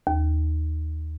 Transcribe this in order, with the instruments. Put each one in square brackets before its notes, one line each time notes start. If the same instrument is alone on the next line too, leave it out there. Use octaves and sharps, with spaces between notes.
[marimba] D#2